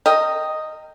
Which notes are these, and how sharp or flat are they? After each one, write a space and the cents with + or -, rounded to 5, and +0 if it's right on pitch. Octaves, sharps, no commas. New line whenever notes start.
A#4 -25 D#5 +0 G5 +0